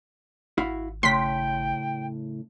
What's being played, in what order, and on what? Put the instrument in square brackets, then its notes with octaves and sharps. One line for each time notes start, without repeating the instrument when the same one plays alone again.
[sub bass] G#1 [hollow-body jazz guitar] E4 F#4 F5
[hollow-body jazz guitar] A2 C#3 [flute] G5 [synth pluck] C6 B6